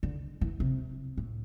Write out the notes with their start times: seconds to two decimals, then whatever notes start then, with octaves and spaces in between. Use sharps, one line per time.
0.03 D3
0.41 E3
0.60 C3
1.18 A2